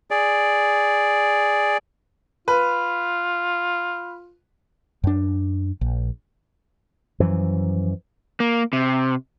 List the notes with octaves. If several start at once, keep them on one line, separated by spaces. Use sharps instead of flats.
G#4 D5
F4 B4
F#2 D4
A#1
F#2 E3 F3
A#3
C3